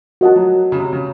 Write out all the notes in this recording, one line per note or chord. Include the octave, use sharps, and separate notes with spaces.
F3 F#4 A#4 D#5 F#5 A5
F#3
C#3
C3
C#3